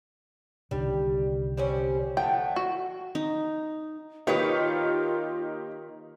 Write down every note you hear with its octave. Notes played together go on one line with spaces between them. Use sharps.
C2 D3 D#3 G3
G3 C4 C#4
D3 F3 A3 G5
F#4
D#4
D#3 A#3 D#4 F4 G4 B4 C#5